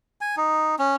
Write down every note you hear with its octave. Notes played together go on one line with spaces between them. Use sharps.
G#5
D#4
C#4